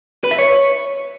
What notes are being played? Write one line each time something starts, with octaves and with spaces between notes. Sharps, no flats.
B4
E5
C#5